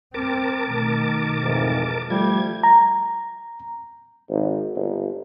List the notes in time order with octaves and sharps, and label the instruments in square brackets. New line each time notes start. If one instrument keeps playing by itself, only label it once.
[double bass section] G2 C4 [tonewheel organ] A#4 A5 D6
[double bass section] B2 D#3 A3
[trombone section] F2 G#2 E3
[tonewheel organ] F3 G#6 [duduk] G3 [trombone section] A3
[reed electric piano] A#5
[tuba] G#1
G1